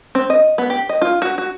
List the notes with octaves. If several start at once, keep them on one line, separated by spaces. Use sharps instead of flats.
C4
D#5
B3
G4
D#5
F4
F#4
F#4